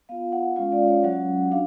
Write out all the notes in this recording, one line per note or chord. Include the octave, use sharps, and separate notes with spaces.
B3 F4 F5
F#5
G#3 C#4 F4 F5
D5
C#5
F#3 C#4 F#4 F#5
D4 F5